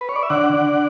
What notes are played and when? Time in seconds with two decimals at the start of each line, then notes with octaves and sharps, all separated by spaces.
0.01 B4
0.09 C#5
0.16 D5
0.23 E5
0.30 D3 D5 F#5
0.53 D3